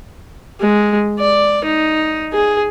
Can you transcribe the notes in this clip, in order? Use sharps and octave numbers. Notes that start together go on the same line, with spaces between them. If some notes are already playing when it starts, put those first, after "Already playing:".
G#3
D5
D#4
G#4